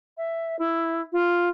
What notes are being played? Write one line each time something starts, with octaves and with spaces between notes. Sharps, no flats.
E5
E4
F4